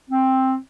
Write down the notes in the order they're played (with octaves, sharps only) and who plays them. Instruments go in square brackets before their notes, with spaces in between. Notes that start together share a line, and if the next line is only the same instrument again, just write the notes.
[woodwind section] C4